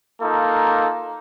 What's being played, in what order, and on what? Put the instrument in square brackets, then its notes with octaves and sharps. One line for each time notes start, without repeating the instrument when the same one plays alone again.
[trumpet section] A#3 D#4 F4 A4